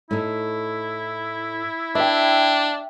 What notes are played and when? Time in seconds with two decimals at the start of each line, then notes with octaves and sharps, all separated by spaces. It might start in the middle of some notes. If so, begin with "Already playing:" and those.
0.11 A2 D#4 E4
1.95 D4 B4 E5 G5